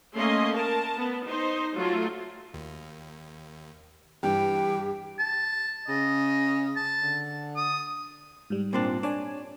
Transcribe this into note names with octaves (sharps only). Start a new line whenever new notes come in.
A3 A#3 C#4 D#5 C6
A#4 A5
B3
D#4 C5
F#3 A3 F4
D#2
G2 E3 G4 G5
A5
C#3 D#5
A5
D3
D#6
G#2 G3
A#2 C4 D4
D4 C#5 D5 G#5